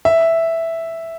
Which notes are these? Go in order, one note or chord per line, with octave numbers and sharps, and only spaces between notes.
E5